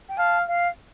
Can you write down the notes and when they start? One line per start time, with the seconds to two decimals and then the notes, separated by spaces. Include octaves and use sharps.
0.09 G5
0.18 F5 A5
0.48 F5